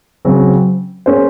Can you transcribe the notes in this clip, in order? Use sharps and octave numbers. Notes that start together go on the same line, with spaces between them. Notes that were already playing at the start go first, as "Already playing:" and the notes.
C#3 F#3 C4
A#3 C#4 G#4 C5